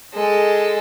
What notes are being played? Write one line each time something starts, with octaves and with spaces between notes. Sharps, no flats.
G#3 A4